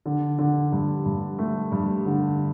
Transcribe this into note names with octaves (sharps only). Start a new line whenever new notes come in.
D3
D3
G2
G2
A3
G2
D3